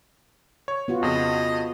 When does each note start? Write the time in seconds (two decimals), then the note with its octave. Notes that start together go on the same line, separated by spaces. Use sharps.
0.68 C#5
0.88 B3 F4 F#4
1.03 F2 C#3 D#5